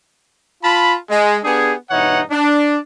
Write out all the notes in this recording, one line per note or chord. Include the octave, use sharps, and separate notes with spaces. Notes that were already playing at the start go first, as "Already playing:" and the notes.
F4 A5 B5
G#3
B3 D4 G4 G#4
G2 B2 E3 D#4 C#5 F#5
D4